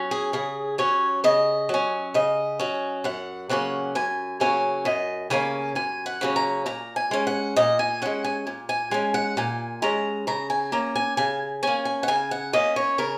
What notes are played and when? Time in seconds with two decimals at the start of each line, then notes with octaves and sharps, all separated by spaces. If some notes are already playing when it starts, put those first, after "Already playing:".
Already playing: F#3 C#4
0.11 G#4
0.33 C#3 G#4
0.78 F#3 C#4 C#5
1.24 C#3 D#5
1.69 F#3 C#4
2.14 C#3 D#5
2.60 F#3 C#4
3.04 F#2 F#5
3.49 C#3 F#3 A#3 C#4 F#5
3.95 F#2 G#5
4.40 C#3 F#3 A#3 C#4 G#5
4.85 F#2 D#5
5.30 C#3 F#3 A#3 C#4 G#5
5.75 F#2 G#5
6.06 F#5
6.21 C#3 F#3 A#3 C#4
6.36 A#5
6.66 A#2 A#5
6.96 G#5
7.11 G#3 C#4
7.27 F#5
7.56 A#2 D#5
7.79 G#5
8.02 G#3 C#4 F#5
8.24 G#5
8.47 A#2
8.69 G#5
8.91 G#3 C#4 G#5
9.14 F#5
9.37 A#2 G#5
9.82 G#3 C#4 A#5
10.27 C#3 A#5
10.50 G#5
10.72 A#3 C#4 A#5
10.96 G#5
11.17 C#3 G#5
11.63 A#3 C#4 G#5
11.85 G#5
12.03 F#5
12.08 C#3 G#5
12.31 F#5
12.53 A#3 C#4 D#5
12.76 C#5
12.98 C#3 A#4